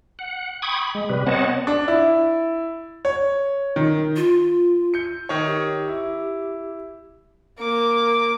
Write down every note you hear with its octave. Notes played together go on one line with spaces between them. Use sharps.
F#5
G5 B5 C#6 D#6 G#6
B5
G#3
C3 G3 B4
B3 C4 C#5 D#5 F#5 A5
D4
E4
C#5
D#3
F4
G6 C#7
D#3 C#5
G4
E4
A#3 D6